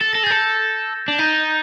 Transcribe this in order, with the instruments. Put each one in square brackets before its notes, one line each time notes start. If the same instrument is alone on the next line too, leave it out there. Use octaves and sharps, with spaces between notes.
[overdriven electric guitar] A4 [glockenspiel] A6
[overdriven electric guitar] A4 [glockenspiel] A#6
[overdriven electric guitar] G#4
[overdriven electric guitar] A4 [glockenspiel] G6 A6
[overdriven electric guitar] D4
[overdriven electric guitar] D#4 [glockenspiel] G6 A6